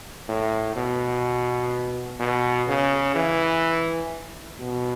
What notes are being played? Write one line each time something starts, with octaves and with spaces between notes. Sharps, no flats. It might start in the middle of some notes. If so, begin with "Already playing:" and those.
A2
B2
B2
C#3
E3
B2